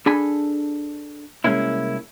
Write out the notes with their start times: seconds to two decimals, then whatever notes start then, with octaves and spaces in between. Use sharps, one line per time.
0.06 D4 G#4 A4 G#5 B5
1.44 C2 G#3 A#3 C#4 E4